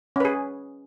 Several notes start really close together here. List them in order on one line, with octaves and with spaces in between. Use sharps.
C#4 B4 G#4